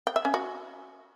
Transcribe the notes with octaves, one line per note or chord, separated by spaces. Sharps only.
G5
E5
C#4
F#4